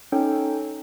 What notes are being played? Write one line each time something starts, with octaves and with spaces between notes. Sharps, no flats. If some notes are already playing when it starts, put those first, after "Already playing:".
C#4 D#4 A4 C#5 G5